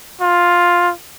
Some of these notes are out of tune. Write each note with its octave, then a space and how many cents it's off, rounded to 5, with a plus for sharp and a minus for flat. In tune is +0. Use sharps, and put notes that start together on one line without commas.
F4 +5